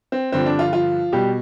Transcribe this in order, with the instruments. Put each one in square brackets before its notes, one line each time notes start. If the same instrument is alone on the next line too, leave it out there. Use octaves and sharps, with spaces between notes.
[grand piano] C4
G2 D3 F3 C4
D4
F3 F4
F3 F4
B2 G3 G4